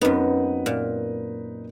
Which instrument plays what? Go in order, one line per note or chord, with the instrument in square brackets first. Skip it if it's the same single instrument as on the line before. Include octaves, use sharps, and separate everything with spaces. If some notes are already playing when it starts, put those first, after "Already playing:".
[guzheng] F#2 B3 [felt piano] C4 D#4 B4
[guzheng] A#2